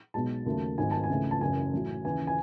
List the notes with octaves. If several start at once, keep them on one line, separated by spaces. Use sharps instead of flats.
B1 B2 G#3 A5
D#2 C#3 F#3 A3
G#1 G#2 F#3 A3 G#5
A5
G#5
C#2 C#3 E3 A3
A5
F#1 F#2 C#3 E3 G#5
A1 A2 F#3
D#2 C#3 E3 G#5
G#5